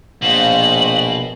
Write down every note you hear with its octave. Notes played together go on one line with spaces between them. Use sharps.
A#1 B2 C5 F5 F#7